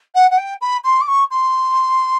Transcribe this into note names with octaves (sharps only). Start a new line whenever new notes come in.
F#5
F#5
G5
B5
C6
D6
C#6
C6